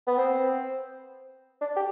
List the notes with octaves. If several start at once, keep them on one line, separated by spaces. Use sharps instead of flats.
B3
C4
D4
G4